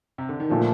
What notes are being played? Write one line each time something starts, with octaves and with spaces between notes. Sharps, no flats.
C3
D3
D#3
A#2 D3 F3 A3